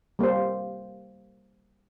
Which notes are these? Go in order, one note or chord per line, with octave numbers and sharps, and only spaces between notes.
G3 A#3 G4 C5